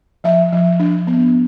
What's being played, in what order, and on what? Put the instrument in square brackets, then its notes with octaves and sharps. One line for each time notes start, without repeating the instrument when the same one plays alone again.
[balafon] F3 E5
F3
D4
B3